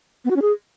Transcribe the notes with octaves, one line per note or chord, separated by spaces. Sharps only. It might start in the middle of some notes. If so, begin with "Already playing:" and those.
B3
F#4
C#4
G#4